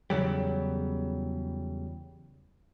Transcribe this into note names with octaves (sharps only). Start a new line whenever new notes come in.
E2 C#3 F#3 G3